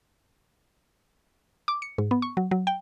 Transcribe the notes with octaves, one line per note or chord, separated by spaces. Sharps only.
D6
C#7
G#2
B3
C#6
F#3
F#3
G5